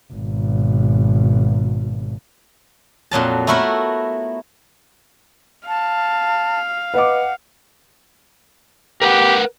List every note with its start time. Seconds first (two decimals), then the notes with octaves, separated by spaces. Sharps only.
0.13 G#1 B2
3.11 F2 A#2 F#3 A5
3.47 A3 B3 E4 F#4 A#4 E5
5.68 F5 A5
6.94 B4 D#5 F#5 D6
9.02 G4 A#4 B4 F#5